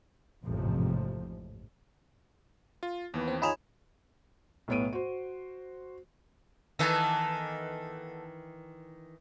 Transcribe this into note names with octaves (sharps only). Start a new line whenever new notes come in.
A1 F2 G#2 C3 F3
F4
D#2 E3 B3
C4
D#4 F4 G#4 C#5 B5 E7 F7
B1 A2 B3 C#5 D7 D#7
F#4 C5
D#3 E3 B3 D#4 A4